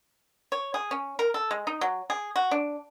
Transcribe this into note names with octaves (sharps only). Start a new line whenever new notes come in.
C#5
G#4
C#4
A#4
A4
G#3
D#4
F#3
G#4
F#4
D4